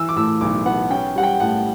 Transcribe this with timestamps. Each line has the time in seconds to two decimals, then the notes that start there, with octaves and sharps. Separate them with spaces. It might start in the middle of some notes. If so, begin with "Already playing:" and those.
Already playing: E3 E6
0.09 D6
0.16 A2 E6
0.41 B1 D6
0.66 B3 F#5
0.90 C#4 G5
1.16 G3 F#5
1.23 G5
1.40 A2 F#5